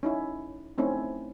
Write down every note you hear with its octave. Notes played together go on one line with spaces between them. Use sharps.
C#4 D#4 E4
A3 C4 C#4 D#4 E4